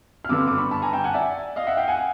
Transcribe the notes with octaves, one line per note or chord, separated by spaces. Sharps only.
F6
G2 D3 G3 B3 D6 E6
D6
B5 C#6
A5 B5
G#5 A#5
G5 A5
F#5 G#5
D5 E5
D#5 F5
E5 F#5
F5 G5
F#5 G#5